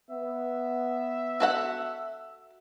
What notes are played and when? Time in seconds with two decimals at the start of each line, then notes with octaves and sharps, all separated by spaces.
0.10 B3 E5
1.40 F#4 A4 F#5